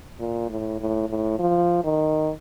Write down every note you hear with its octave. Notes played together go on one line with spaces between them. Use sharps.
A#2
A2
A2
A2
F3
D#3